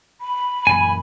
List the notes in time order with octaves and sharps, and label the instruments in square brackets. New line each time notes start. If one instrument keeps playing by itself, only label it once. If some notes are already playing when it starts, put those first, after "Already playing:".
[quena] B5
[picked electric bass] F#2 A#2 E3 [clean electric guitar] G#5